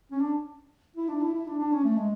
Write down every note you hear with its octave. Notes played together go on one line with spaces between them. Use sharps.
C#4
D4
E4
D4
E4
E4
D4
D4
C#4
A3
G#3